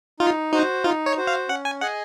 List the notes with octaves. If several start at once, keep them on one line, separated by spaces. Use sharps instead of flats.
D#4 F4
D#4 F#4 C5
D#4 F4
C#5
F#4 C5
F5
C#4 F#5
G#5
G#4 D#5 F#5 G#5